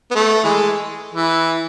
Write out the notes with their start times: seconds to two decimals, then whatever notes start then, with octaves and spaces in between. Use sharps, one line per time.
0.11 B3
0.15 A3
0.44 E3 G#3
1.15 E3